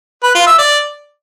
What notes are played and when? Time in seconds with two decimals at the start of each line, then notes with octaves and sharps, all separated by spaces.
0.23 B4
0.35 F4
0.47 E5
0.58 D5